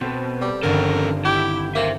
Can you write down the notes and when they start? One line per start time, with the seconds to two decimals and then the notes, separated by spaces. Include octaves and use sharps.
0.01 B2 C4 A4 B4
0.41 G3
0.63 G1 G2 D#3 F3 C#4 A4 A#4
1.25 E4 G4
1.75 A#3 C5 E5